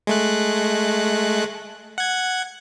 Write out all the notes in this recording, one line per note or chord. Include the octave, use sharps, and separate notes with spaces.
G#3 A3 F#6
F#5 G#6